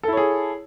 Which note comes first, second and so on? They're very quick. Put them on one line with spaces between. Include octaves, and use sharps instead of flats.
A4 E4 C#5 G#4